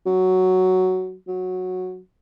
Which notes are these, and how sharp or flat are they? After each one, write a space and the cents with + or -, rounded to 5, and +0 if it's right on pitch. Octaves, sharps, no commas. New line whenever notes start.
F#3 +5
F#3 -10